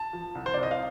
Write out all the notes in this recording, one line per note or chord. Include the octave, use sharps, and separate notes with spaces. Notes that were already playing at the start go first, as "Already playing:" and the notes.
Already playing: A5
F3
C2
C5
C2 D5
D#5
F5